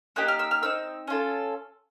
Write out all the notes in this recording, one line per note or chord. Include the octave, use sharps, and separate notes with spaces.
A#3 D#4 G4 F#6
F6
E6
F6
C4 D#4 E6
C#4 F4 A4